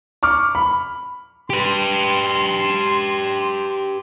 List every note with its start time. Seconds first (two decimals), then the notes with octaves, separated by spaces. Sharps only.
0.23 C#6 D6 F6
0.55 B5
1.50 G4 B4 C6